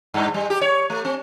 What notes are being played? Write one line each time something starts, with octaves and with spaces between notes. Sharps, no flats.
G2
G3
G4
C#5
A3
C4